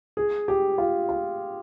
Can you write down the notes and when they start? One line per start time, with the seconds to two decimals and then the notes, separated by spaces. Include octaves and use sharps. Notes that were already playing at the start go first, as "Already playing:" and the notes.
0.17 G#4
0.48 G4
0.78 F4
1.09 F4